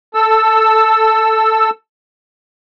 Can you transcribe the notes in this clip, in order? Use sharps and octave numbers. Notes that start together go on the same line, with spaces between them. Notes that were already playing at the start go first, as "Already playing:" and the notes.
A4 E6